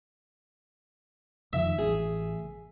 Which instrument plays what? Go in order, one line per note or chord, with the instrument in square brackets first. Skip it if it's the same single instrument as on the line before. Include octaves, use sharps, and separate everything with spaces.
[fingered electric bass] F2 D#3 [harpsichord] E5
[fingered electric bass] A1 [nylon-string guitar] G#4